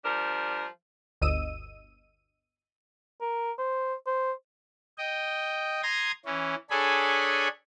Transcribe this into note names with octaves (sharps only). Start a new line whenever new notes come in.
F3 G3 D4 A#4
G1 D2 D#5 E6 D#7
A#4
C5
C5
D#5 G5
A#5 C6 D#6 G#6 A#6
E3 C#4
D4 G#4 A4 C#5 G#5 B5